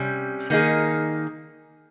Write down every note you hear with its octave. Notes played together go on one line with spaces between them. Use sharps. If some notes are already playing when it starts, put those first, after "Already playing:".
Already playing: C3 G3 C#4
D#3 A#3 D#4 G#4